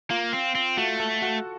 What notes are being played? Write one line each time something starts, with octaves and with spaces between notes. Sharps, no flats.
A#3 F4 F5
C4
C4
A3 F#4 F#5
A4 A5
F#4 F#5